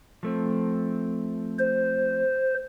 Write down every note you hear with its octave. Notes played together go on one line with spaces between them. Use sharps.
F3 A3 C4
C5